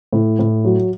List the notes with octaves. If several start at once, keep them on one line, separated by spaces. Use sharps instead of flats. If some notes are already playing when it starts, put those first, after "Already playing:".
A2
A2
F#3